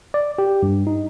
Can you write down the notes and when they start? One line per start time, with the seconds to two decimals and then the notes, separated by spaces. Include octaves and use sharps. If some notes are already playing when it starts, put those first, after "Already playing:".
0.14 D5
0.38 G4
0.63 G2
0.87 D#4